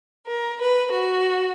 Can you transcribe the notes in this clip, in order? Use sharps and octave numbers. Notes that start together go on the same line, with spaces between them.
A#4
B4
F#4